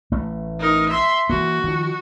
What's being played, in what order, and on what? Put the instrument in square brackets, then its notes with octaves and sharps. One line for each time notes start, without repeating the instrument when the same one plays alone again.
[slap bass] A1 A3
[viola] D#4 A#4
E5 C6
[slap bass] E3 A#3 [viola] F#4
[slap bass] D#3 F3